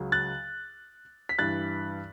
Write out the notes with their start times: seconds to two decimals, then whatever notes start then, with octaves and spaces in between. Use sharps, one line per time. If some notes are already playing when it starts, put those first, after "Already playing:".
Already playing: C#2 C#3 F#3
0.12 F#6 A6
1.29 B6
1.38 G2 E3 F#6 A6